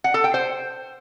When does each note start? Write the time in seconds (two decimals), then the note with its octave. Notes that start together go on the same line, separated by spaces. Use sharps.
0.04 F#5
0.14 A4
0.24 G5
0.34 C5